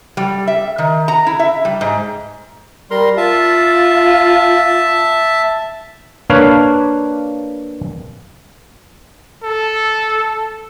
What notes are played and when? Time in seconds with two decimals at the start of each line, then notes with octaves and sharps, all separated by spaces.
0.17 G3
0.48 E5
0.78 D#3
1.08 A#5
1.27 E4
1.39 E5
1.65 G3
1.81 G#2
2.91 G3 A#4 C6
3.17 F4 E5 A5
6.30 A#3 D4 B4 C#5 F5
9.43 A4